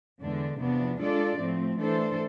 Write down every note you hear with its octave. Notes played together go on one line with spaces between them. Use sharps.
E2 D3 G#3 D4
E2 C3 F3 B3 D4
G#3 D4 F4 A4 D5
A2 F3 A3 C4
E3 A3 D4 A4 C5